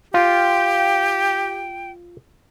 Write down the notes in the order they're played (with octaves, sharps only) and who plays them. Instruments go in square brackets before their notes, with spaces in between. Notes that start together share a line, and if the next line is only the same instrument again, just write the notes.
[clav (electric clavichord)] F4 [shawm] G4 [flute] G5